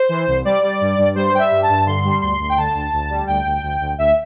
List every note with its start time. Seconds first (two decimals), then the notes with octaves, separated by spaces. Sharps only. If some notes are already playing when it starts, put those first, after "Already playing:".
Already playing: C5
0.09 E3
0.27 C2
0.45 G3 D5
0.62 G3
0.81 G2
0.98 G2
1.15 G3 C5
1.33 G3 G5
1.39 E5
1.51 G2
1.62 A5
1.69 G2
1.86 D3 C6
2.04 G3
2.22 D2 C6
2.39 D2
2.49 G5
2.57 D3 A5
2.75 D2
2.93 D2
3.10 G3
3.27 D2 G5
3.45 D2
3.63 D2
3.81 D2
3.98 D2 E5